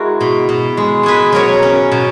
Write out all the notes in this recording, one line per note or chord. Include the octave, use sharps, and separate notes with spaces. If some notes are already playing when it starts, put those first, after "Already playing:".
Already playing: G#3 E4 F#4 A#4
B2
B2
G#3
B2 G#4 B4
F#3 A#4 C#5
C#4
B2